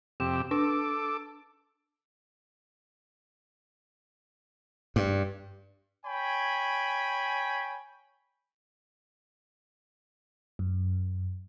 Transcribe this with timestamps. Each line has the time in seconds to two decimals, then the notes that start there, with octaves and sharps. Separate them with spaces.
0.20 F2 C3 G4 E7
0.51 D4 A4 D6
4.96 G2
6.06 C#5 G5 G#5 B5
10.59 F#2